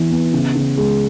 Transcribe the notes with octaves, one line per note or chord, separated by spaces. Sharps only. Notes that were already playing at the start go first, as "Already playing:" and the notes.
Already playing: E3 B3 E4
B3
C#3
C#3
G#3